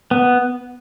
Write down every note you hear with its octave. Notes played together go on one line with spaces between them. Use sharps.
B3